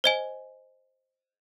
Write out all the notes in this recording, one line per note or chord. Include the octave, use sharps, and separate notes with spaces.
C5 D#5 G#5